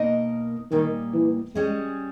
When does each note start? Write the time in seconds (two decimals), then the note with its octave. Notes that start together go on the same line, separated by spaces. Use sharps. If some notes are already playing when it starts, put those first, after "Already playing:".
Already playing: B2 A#3 D#4 A#4 D#5
0.72 A#2 D#3 G3 A#3 D#4
1.14 E3
1.55 G3 G#3 C#4 G#4 D#5